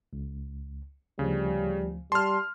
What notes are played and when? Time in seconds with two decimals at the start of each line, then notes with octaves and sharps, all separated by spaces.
0.13 C#2
1.19 D2 C#3 F3 G3
2.12 G3 A5 C6 F6